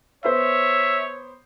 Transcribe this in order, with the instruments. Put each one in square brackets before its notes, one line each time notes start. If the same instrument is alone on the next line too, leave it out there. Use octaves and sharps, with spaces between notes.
[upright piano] B3 C5 [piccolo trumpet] C#5 [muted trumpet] E5